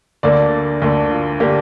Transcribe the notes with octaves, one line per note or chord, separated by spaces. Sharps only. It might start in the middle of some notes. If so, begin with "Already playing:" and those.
D2 D3 A#3 D5
D2 D3 A#3
F4
D3 A#3 G4